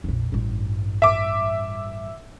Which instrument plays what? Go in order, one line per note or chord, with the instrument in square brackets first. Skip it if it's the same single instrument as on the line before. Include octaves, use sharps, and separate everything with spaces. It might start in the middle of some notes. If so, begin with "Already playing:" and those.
[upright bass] A#1 F2
A1 G2
[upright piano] E5 D6